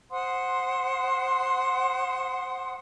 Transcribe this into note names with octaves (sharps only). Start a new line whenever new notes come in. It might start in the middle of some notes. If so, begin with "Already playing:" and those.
C5 F#5 C6 D#6